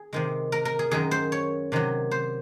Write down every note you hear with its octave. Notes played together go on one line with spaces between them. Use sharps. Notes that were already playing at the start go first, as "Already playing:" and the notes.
Already playing: G#4
C3 D#3 G#3
A#4
A#4
G#4
F#2 D#3 G#3 G#4
C5
C#5
C3 D#3 F#3
C5